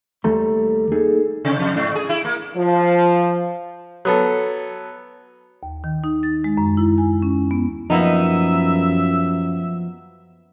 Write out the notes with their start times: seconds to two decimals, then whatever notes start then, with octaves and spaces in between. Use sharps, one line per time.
0.24 D#2 G3 A3 A4 A#5 C6
0.92 A#3 D#4 G#4 A4
1.45 C3
1.59 F2
1.76 G#2
1.95 G#4
2.09 E4
2.25 A#3
2.57 F3
4.05 F#3 B3 A4
5.63 D#2
5.84 D#3
6.04 D#4
6.23 A6
6.44 G#3
6.57 F#2
6.77 E4
6.98 G#5
7.22 C#4
7.51 B3
7.90 F#2 F3 A#3 B3 D#4 E5